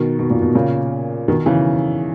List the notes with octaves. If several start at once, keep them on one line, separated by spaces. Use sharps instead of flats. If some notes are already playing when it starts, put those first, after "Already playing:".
Already playing: B2 D#3
B2
A#2
B2
A#2 C#3
B2 D#3
C#3 E3